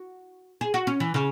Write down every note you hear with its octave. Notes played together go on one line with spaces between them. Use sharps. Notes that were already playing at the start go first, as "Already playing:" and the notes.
Already playing: F#4
G#4
F#4
C#4
E3
C#3